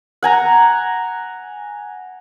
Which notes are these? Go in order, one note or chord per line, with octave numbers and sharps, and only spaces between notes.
F#5 G#5 A#5